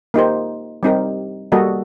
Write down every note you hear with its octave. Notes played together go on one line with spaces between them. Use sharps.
A#3 D#4 G4 C5
G3 C4 D#4 G4 A#4
G3 A#3 F#4 A4 D#5